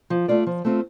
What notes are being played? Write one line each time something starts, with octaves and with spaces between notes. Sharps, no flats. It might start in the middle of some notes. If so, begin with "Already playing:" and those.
F3
A3 F4 D5
F3
A3 C4 F4